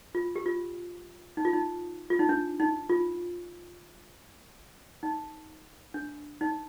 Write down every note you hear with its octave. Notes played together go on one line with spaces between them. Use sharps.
F4
G4
F4
D#4
F4
D#4
F4
D#4
D4
D#4
F4
D#4
D4
D#4